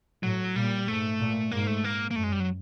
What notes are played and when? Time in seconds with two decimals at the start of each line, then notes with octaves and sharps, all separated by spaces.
0.23 A2 F#3
0.55 A#2 G3
0.87 G#2 A3
1.19 A#2
1.51 G#2 A#3
1.67 A3
1.84 A#3
2.11 A#3
2.16 F#2 A3
2.24 G#3
2.32 G3
2.40 F#3